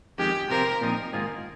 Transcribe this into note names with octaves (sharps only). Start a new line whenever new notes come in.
F2 D#3 G#3 G4
C3 F3 C4 F4 A#4 C5
A#2 F3 C4 D#4
G#2 D#3 A#3 F4 G#4